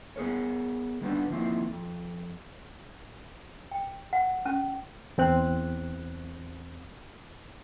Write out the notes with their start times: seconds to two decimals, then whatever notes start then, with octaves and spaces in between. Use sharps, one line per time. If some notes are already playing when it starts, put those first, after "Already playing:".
0.16 B3 G#4 A#4 C#5
1.01 D#3 G3 B3 D4
1.30 D#3 F3 A#3 C4 E4
1.70 F2
3.72 G5
4.13 F#5
4.46 C#4
5.18 E2 C4 F#6